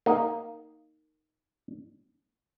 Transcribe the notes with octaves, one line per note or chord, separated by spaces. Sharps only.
A#3 D#4 D#5